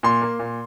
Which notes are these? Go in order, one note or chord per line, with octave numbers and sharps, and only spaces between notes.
A#2 C6
A#3
A#2